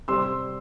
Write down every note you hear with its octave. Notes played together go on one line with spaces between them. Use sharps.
C3 G3 C4 C6 E6